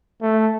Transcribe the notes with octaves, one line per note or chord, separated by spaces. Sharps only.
A3